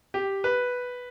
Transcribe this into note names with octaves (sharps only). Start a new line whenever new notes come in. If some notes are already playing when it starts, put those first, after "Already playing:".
G4
B4